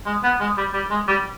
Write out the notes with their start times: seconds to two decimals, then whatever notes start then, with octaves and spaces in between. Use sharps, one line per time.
0.06 G#3
0.23 B3
0.40 G#3
0.57 G3
0.74 G3
0.90 G#3
1.08 G3